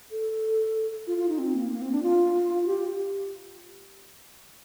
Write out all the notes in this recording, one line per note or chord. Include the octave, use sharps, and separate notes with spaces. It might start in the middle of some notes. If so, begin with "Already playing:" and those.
A4
F4
F4
D#4
C4
A#3
A#3
C4
D4
F4
G4